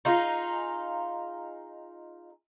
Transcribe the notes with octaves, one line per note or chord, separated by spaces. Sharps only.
D#4 F4 G#4